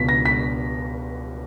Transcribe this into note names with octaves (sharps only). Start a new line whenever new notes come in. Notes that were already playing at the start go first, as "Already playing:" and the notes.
Already playing: C#2 B2 B6
A#6
B6